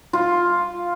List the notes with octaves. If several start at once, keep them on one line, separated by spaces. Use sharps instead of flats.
F4